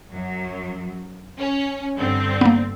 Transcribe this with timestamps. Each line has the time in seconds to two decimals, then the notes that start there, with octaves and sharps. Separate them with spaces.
0.11 F#2 F#3
1.38 C#4
1.98 G2 D3 C4
2.41 A#3 B3